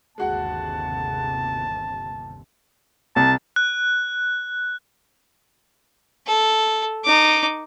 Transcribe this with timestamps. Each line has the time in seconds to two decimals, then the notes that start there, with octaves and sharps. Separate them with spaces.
0.18 G1 D#2 C3 G#3 F#4 F#5 A5
3.16 C2 A5
3.56 F#6
6.27 A4
7.05 D#4 D6